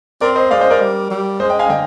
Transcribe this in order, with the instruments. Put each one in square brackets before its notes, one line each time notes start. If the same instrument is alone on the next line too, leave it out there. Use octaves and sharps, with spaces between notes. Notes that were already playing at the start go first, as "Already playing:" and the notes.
[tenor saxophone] C4 [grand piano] A#4 D5
[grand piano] C5 D#5
[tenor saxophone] G#3 [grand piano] D5 F5
[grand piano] C5 D#5
A#4 D5
[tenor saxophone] G3
G3
[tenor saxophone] G#3 [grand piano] C5 D#5
[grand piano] D#5 G5
F5 G#5
[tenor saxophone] D3 [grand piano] D#5 G5